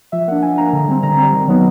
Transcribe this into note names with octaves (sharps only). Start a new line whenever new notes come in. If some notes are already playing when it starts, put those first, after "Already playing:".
F3 E5
A#3 D4 F#5
F3 G#5
A#3 D4 A#5
D3
G3 C4
D3 A#5
G3 C4
D#3
F#3 B3 D#4